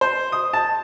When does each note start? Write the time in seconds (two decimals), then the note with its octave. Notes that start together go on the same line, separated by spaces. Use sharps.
0.01 C5
0.32 D#6
0.53 A5